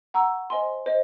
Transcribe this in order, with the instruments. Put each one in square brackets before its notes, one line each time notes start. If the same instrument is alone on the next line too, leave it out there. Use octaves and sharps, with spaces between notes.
[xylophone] F#5 A#5 C#6 E6
C5 D#5 G#5 C6
C5 D#5